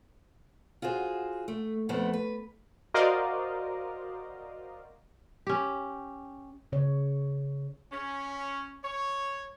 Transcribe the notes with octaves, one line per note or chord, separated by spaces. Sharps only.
F4 F#4 G#4 C5
A3
F2 F3 A3 B3 C5
B4
F#4 A#4 C5 D5 D#5 F5
C#4 G4
C#3 C#5
C#4
C#5